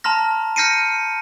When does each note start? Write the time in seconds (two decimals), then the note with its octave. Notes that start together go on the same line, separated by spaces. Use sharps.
0.04 A5 A#5 C6 F6 A#6
0.56 F6 G6 A#6 C7 C#7 D#7